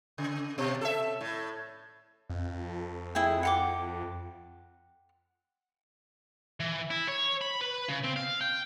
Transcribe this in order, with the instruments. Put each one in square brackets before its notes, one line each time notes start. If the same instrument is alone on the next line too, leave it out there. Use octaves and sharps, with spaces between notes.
[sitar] C#3
B2
A4 E5
A2
[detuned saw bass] F2
[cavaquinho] E4 G#4 G5
F#5 G5 D6
[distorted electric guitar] E3
E4
C#5
B5
B4
C#3
C4
F5
G5